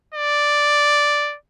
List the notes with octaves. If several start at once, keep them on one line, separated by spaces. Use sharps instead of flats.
D5